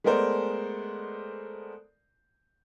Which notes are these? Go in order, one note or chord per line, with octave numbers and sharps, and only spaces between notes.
G#3 A3 B3 A#4 C5 D5